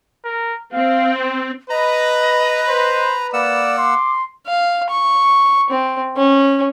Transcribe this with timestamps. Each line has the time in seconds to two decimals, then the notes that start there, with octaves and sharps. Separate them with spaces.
0.25 A#4
0.73 C4 F5
1.14 C5
1.70 B4 D#5 A#5
2.68 C5
3.33 A#3 D5 F#5 E6 E7
3.78 C6 D6
4.48 F5
4.90 C#6
5.70 C4
6.17 C#4